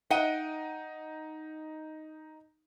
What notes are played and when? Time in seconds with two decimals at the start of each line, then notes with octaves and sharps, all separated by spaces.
0.10 D#4 D#5 F#5 G5 D#7